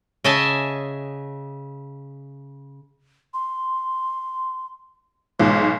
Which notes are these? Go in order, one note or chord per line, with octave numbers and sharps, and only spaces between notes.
C#3 D#5 E5 G#5 A5
C6
B1 G#2 C6